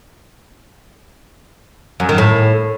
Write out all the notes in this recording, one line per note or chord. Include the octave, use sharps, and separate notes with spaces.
F#2
D#3
A2